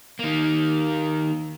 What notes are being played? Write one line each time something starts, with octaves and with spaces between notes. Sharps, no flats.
D#3 A#3